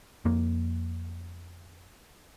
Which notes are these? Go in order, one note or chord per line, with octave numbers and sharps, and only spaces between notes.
F2 A#3